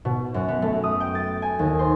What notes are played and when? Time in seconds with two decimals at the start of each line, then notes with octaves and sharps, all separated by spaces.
0.05 B2
0.34 F#2
0.48 B3
0.62 A3
0.84 D#6
1.00 G5
1.15 A6
1.42 G#5
1.59 D#2
1.79 C5